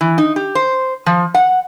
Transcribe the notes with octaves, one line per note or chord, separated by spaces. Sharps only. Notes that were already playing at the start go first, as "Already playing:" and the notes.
E3
D#4
G4
C5
F3
F#5